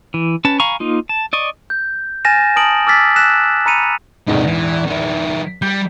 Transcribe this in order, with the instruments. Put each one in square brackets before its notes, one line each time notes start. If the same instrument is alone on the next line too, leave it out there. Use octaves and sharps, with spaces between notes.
[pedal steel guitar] E3
C#4 B4 A5
F5 G#5 A#5 B5 C#6
A#3 D#4 F4
A5
D5 D#5 C#6
[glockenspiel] G6
G#5 F6 A6 A#6 D#7 E7
A5 A#5 D#6 F6 D7 F#7
D6 E6 F6 A6 B6
E6 F#6 A#6 B6 E7
A#5 B5 C#7 D#7 F7
[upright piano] A#1 E2 G#2 [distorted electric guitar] C3 D#4
[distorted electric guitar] E3
D#3 E4
[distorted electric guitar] G3 [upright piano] G6